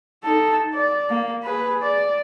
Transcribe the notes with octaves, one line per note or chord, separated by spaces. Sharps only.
D#4 A4
D5
A#3
G#4 B4
D5